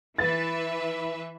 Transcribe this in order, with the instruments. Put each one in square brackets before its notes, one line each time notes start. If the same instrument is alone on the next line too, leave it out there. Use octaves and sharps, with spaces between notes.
[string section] E3 B4 E5 [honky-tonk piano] A6